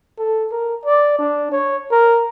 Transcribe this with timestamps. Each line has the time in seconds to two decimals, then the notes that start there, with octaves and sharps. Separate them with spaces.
0.18 A4
0.51 A#4
0.85 D5
1.18 D4
1.52 C#5
1.91 A#4